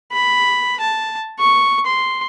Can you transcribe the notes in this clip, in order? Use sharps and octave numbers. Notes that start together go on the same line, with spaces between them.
B5
A5
C#6
C6